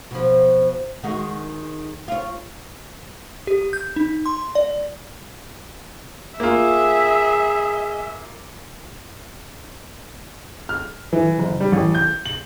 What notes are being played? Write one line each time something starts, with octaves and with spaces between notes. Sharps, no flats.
B2 F3
D#3 G#3 F#4
F4 C#5
G4
G6
D#4
C6
D5
A#3 F4 G#4 E5
F6
E3
F#1
G3
A1
G6
F#7